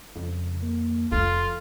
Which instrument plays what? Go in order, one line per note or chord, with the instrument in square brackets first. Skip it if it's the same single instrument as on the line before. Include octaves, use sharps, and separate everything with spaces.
[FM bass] F2 [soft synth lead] C#3
[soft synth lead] A#3
[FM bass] F1 [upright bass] F2 [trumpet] F4 [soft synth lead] A4